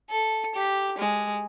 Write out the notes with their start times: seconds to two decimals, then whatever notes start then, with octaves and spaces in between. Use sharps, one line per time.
0.10 A4
0.55 G4
0.98 G#3